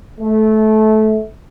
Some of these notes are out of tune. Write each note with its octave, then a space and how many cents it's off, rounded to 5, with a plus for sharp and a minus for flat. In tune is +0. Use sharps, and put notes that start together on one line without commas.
A3 -20